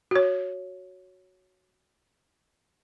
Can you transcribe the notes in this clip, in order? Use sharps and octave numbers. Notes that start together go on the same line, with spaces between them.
F#4 C#5